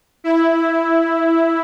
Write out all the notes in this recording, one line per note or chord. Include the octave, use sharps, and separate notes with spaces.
E4